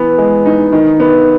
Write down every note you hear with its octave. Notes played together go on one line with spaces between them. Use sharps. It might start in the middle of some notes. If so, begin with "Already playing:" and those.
Already playing: E3 B3
G#3
D#4
D#3
B3